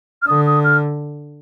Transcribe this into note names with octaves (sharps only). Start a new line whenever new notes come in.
F6
D3 D#6
D#6
F6